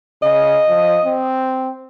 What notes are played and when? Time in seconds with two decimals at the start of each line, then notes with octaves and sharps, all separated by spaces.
0.23 C#3 D#5
0.69 F3
1.05 C4